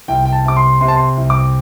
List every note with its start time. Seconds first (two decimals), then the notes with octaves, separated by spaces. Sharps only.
0.08 C2 G5
0.25 G5
0.33 A5
0.45 C3 D6
0.56 C6
0.81 C3 C6
0.88 A5
0.96 C6
1.17 C2
1.30 D6